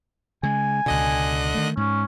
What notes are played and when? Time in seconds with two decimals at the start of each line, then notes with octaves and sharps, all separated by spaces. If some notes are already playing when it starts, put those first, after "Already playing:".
0.43 C#3 G#3 G#5
0.86 C#2 B2 D3 D#5 F#6
1.54 D#3 A3
1.77 G#2 C#4